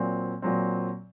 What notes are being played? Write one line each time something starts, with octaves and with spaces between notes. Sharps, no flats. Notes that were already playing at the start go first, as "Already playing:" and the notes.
Already playing: A#2 F#3 C4
A#2 F#3 C4